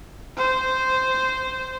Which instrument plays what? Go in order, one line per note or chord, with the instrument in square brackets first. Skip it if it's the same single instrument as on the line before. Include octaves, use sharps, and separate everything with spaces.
[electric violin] C5